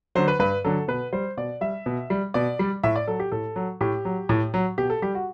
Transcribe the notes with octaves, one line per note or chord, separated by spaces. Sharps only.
D3 F#3 C5
B4
G2 B4
D3 F#3 A4
B2 B4
G3 C5
B2 D5
G3 E5
B2
G3
B2 D5
G3
A2 E5
D5
F#3 A4
G4
A2 A4
F#3
A2 G4
F#3
A2
F#3
B2 G4
A4
G3 G4
F#4